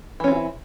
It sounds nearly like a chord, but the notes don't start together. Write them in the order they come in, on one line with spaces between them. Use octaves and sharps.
E3 C#4 C4 F4 E4